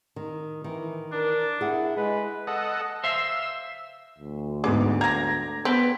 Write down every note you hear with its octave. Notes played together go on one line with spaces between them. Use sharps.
D#3
D#3 E3
D4 A#4
E4 G#4 F#5
G#3 B4
A4 D#5 F#5
C5 E5 F5 E6
D2
G#2 B3 G#4 D6
A#5 G#6 A#6
B3 C4 B4